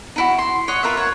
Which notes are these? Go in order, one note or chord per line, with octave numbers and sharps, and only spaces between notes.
D#4 E4 F#4
C6
C#5 D#5 F#5 C#6
F4 A#4 B4 E5
C#5 F#5